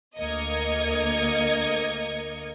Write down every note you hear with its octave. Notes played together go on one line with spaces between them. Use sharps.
D2 A#3 A#4 D#5 G#6 C#7